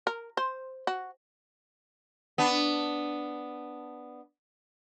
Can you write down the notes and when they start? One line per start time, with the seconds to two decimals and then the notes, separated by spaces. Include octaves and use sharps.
0.07 A#4
0.37 C5
0.87 F#4
2.38 B3 D4